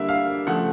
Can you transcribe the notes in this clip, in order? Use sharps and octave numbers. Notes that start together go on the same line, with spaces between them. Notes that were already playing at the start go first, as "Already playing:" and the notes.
Already playing: D3 G3 A#3 E5
F5
C#3 F3 A3 F#5